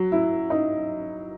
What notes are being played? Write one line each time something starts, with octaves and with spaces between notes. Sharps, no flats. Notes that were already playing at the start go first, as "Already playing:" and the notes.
Already playing: F#3
E4
D#4